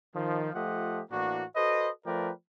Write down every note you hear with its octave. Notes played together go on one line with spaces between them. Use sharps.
D#3 F3
F3 A3 F4 G4 D#5 F#5
A2 E3 A#3 D4 F#4
F#4 A4 B4 C5 D#5
F3 A3 A#4 B4 D5 G5